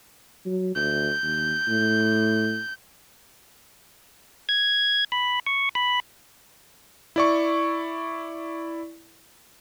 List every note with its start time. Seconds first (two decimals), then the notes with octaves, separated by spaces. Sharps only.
0.46 F#3
0.76 D2 G6
1.22 D#2
1.68 A2
4.49 G#6
5.12 B5
5.46 C#6
5.75 B5
7.16 E4 D5 C#6